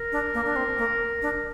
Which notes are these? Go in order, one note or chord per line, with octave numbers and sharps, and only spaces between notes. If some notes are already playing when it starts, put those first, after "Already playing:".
Already playing: A#4
D4
A#3
D4
C4
A#3
D4